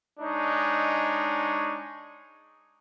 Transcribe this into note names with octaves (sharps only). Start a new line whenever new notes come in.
G#3 D4 D#4 C#5